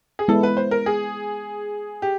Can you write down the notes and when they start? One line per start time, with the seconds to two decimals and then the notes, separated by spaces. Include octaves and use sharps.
0.19 G#4
0.28 G#3 B3 E4 A4
0.43 B4
0.57 C5
0.71 A#4
0.86 G#4
2.02 G4